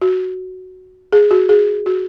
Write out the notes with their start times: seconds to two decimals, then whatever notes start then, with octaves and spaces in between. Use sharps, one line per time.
0.02 F#4
1.12 G#4
1.31 F#4
1.49 G#4
1.86 F#4